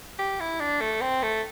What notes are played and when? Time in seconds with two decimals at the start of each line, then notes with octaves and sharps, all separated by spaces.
0.19 G4
0.40 E4
0.60 D4
0.81 A3
1.01 C4
1.23 A3